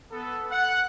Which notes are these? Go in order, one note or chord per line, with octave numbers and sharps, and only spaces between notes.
B3 A4
F#5